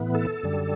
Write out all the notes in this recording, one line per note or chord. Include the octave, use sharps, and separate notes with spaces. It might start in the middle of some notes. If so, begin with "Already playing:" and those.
Already playing: A2 E3 B3
A4
F#2 D3 G3